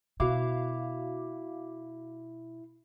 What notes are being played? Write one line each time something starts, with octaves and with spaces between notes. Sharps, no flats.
B2 E4 F#4 F5 D6